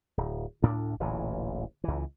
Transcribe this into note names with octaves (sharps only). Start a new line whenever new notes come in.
D1
D2 A2 D4
D1 A1 A#2 E3
C#2 E3